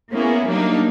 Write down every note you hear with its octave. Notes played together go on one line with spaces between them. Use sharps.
A#3 B3 C#4 E4 G#4
F#3 G3 A#3 D4 D#4